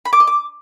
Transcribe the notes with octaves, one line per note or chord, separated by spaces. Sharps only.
B5
D6
D#5
D6